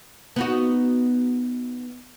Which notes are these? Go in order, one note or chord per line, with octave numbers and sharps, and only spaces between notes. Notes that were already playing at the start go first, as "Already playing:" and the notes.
B3 D#4 F#4